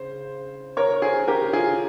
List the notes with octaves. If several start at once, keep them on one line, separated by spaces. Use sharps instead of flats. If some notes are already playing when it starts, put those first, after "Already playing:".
Already playing: C#3 C5
A#4 C#5
G#4 C5
G4 A#4
F4 G#4